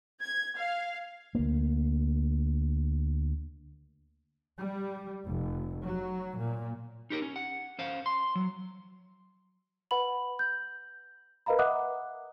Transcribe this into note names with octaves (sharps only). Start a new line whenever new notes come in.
G#6
F5
D2 A#3
G3
F1
F#3
A#2
D#4 G4 A#4
C#4
F#5
C#4 C5 F5
C6
F#3
B4 F#5 B5 F#7
G6
A#4 B4 D#5 F5 A#5 B5
D#5 E5 F#5 D6 D#6 F#6